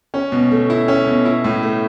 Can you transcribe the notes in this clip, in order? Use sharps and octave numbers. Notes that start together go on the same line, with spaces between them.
C#4
B2
A3
E4
C#4
B2
E4
A2
A3